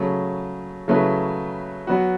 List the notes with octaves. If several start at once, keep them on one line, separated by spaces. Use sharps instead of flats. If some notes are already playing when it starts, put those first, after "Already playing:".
Already playing: C#3 F#3 A3
C#3 F#3 A3 E4 B4
F#3 B3 F#4